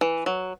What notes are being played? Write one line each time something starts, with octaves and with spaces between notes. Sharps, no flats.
E3
F#3